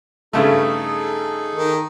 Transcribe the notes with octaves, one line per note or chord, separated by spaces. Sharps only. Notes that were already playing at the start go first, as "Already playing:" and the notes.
G2 C#3 A3 D#4 G#4 A4
D#3